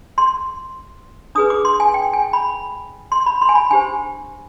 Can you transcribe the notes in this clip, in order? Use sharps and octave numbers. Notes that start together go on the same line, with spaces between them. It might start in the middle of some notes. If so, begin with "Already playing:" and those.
C6
D4 G#4 B4 D#6
D6
C6
G#5
G5
G#5
B5
C6
B5
C6
G#5
B5
D4 G4 C5 G#5